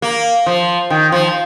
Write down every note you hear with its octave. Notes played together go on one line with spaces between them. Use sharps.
A#3
F3
D#3
F3